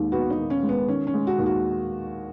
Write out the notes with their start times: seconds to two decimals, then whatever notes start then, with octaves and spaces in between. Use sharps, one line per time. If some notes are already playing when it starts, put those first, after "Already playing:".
Already playing: D#2 G#3
0.12 B3 F#4
0.30 D#4
0.38 D#3
0.50 C#4
0.63 G#3
0.69 B3
0.88 D#3 C#4
1.07 C#4
1.14 G#3
1.27 F#4
1.39 D#2
1.46 F#4